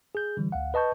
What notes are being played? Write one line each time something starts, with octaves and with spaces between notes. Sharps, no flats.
G#4 G6
D3 E3 G3
D2 F5 F#5
B4 D#5 A5 C#6 G6